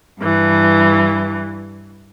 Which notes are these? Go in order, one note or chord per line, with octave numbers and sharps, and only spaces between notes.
G2 E3